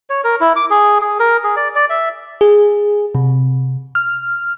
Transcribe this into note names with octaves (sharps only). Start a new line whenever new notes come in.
C#5
A#4
E4
D6
G#4
G#4
A#4
G#4
D5
D5
E5
G#4
C3
F6